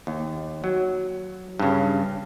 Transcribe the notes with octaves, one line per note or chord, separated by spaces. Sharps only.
D#2
F#3
G2 C#3